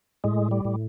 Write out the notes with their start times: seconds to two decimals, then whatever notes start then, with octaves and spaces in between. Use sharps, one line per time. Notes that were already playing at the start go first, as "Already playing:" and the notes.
0.24 A2 G#3
0.51 G3
0.65 A2